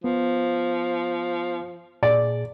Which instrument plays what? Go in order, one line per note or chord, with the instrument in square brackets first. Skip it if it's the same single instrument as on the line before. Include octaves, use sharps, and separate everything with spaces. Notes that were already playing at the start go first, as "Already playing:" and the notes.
[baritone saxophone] F3 [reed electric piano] B3
[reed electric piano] A#2 G#4 [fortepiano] D5